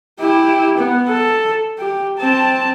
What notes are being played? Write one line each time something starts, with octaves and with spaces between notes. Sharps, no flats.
E4 G4
B3
A4
G4
C4 A5